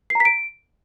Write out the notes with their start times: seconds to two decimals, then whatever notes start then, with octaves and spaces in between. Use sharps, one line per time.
0.10 C7
0.15 A#5
0.20 B6
0.25 D7